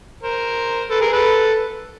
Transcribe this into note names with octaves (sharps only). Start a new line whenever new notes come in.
A#4 C5
A4 B4
G#4 A#4
A4 B4